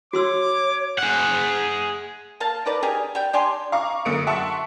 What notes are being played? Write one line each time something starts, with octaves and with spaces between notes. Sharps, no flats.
F#4 C#5 C6 D6 E6
G#4 F#5
A#3 F5 A5
D#4 A#4 B4 D5
G4 G#4 A#4 G#5
G3 G5
D4 G4 G#5 C6
F5 A#5 C#6 D6
F#2 D3 A#3 D#6 C#7 D7
E5 F#5 A5 C6 C#6